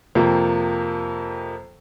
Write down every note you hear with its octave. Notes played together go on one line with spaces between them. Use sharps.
F2 C3 F3 A#3